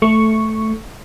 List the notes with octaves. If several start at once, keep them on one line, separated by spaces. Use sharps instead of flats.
A3 C#6